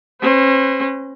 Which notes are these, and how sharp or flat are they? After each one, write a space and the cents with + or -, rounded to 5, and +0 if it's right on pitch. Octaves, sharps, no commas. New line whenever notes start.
C#4 -40 C5 -40